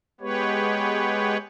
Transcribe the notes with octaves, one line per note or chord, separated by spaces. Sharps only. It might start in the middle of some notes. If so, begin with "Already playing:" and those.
G#3 B3 G4 B4 C#5